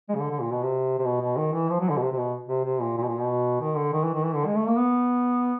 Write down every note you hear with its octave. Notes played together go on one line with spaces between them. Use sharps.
G#3
C#3
D3
D3
A#2
B2
C3
C3
B2
B2
D#3
E3
F3
F#3
D3
B2
C3
C3
B2
C3
C3
A#2
A#2
B2
A#2
B2
D#3
D3
D#3
E3
D#3
E3
D3
G#3
A3
A#3
B3